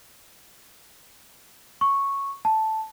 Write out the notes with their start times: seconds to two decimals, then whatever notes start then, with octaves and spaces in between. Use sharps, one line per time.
1.81 C#6
2.45 A5